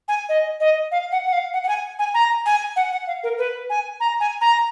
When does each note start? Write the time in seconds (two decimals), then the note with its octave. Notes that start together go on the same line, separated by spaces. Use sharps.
0.08 G#5
0.29 D#5
0.60 D#5
0.92 F5
1.12 F#5
1.26 F#5
1.33 F5
1.53 F#5
1.64 F#5
1.69 G#5
1.99 G#5
2.14 A#5
2.46 G#5
2.76 F#5
2.92 F#5
3.07 F5
3.24 A#4
3.38 B4
3.70 G#5
4.00 A#5
4.20 G#5
4.41 A#5